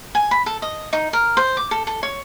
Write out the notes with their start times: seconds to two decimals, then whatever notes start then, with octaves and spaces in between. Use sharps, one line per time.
0.15 G#5
0.31 B5
0.46 A4
0.62 D#5
0.93 D#4
1.13 A#4
1.37 C5
1.57 D6
1.71 A4
1.87 A4
2.03 C#5